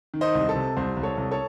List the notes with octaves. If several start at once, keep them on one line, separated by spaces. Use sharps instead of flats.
D#3
C5 D#5
C2
A4
C3
C2 C5
C2
A4 C#5
C2
A4 C#5